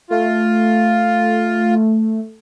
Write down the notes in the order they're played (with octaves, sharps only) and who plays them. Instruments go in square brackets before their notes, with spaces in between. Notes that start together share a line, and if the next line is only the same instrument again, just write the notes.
[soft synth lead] A3 [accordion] F4